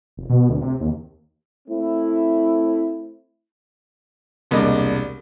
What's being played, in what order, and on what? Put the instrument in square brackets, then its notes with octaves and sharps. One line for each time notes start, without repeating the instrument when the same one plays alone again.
[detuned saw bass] F1
B2
D2
C3
D#2
[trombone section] A3 C4 E4
[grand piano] E1 C2 A#3 D4 D#5